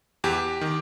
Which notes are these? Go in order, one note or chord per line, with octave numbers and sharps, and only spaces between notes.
E2 G4
D#3